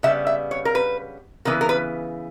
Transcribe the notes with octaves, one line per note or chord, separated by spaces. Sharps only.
C#3 G3 B3 E5
E5
C#5
A#4
B4
C#3 E3 B3 A#4
A#4
B4